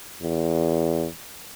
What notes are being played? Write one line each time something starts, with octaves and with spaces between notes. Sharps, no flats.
E2